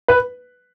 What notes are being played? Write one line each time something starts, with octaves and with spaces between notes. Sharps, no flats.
B4